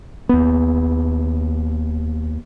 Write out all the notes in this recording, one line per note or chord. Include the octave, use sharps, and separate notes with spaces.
D#2 B3